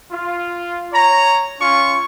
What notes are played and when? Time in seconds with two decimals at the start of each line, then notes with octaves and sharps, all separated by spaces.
0.10 F4
0.91 C#5 A#5
1.60 C#4 F4 C#6